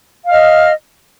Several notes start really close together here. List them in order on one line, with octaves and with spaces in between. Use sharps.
F5 F6 D#5